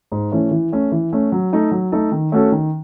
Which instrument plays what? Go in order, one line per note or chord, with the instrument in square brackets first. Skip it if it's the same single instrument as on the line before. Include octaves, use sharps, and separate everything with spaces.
[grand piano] G#2
E3 A3 C#4
E3
A3 C#4
E3
A3 C#4
F#3
A3 D#4 A4
F#3
A3 D#4 A4
D#3
A3 C#4 F#4 A4
D#3